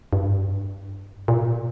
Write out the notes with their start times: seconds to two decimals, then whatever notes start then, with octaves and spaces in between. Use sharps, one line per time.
0.13 G2
1.28 A#2